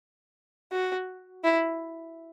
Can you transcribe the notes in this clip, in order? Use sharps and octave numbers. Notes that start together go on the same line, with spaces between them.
F#4
E4